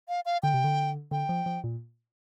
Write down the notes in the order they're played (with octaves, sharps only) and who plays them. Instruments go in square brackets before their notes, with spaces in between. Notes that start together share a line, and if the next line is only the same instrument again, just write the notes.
[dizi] F5
F5
[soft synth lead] D3 [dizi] G5
[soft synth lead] C3
D3
[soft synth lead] D3 [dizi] G5
[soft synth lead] F3
F3
A#2